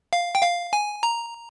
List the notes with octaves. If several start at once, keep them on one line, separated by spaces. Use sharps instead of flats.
F5
G5
F5
G#5
A#5